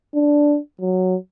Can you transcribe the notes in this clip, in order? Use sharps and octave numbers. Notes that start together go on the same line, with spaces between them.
D4
F#3